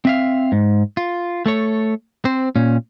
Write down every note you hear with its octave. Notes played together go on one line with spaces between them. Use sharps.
C4 E5 F5
G#2
F4
A3 A4 C#5
C4 C5
A#2 C#4